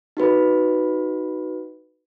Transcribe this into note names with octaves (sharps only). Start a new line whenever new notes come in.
D#4 F#4 B4 B5